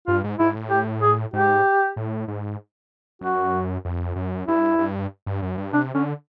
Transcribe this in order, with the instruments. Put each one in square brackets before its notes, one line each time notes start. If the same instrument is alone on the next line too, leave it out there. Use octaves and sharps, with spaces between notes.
[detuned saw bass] G2 [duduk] F4
[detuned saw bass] G#2
[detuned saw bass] G#2 [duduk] E4
[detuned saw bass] A2
[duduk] G4
G#4
[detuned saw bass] G#2 [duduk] G4
[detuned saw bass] A2
G#2
[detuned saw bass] F#2 [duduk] F#4
[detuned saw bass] F2
F#2
[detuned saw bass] G2 [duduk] E4
[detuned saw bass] G2
G2
F#2
G2
[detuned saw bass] C3 [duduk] D4
[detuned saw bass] D3 [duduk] C#4